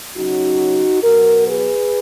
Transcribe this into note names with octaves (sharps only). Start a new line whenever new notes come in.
C#3 F#3 C#4 D#4 F#4
B2 F#3 B3 F#4 A#4
G#4 B4